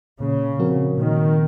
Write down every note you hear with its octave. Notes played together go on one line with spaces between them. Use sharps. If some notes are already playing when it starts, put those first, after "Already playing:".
A#2 C#3
F3 C4 F#4 A#4
A#2 D#3